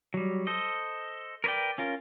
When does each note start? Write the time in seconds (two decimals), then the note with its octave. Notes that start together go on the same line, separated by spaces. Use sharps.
0.14 F#3 G3
0.47 A4 C5 D#5
1.44 A#4 B4 C#5 D5 G5
1.78 C#4 F4 A#4